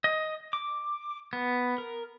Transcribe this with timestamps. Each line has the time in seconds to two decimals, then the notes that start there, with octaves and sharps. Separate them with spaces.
0.04 D#5
0.53 D6
1.33 B3
1.78 A#4